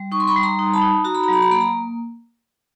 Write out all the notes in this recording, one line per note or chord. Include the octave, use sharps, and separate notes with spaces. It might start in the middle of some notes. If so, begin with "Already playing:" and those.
Already playing: G3
D#4 C#6
C6
B5 C#6
G3
A#5 C6
D#4
A5 B5
D#4
F#4 A#5
B5
A#5
F#3 B5
A#5
A#3 B5
A#5